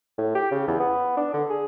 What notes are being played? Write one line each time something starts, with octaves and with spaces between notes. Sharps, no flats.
A2
G4
C#3
E2
B3
D4
D3
G#4